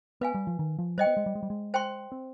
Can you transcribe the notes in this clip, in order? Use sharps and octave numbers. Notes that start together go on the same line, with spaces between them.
B3 B4 F5 G#5
G3
F3
D#3
F3
G3 C5 D#5 G5
B3
G#3
G3
G#3
G3
G#3
C5 G5 C6
C4